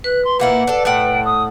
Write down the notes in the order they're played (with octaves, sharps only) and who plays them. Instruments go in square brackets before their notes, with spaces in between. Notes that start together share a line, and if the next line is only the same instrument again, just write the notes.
[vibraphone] B4 [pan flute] F#6
[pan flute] C6
[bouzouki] A#2 A#3 E4 [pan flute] F#5
[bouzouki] D4 A4
[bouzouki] A2 A4 F#5 [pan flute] G5
[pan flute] D#6